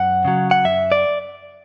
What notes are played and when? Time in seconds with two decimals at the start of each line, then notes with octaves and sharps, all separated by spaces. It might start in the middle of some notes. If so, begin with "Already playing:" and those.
Already playing: F#2 F#5
0.25 C#3 F#3
0.51 F#5
0.64 F#2 E5
0.92 D5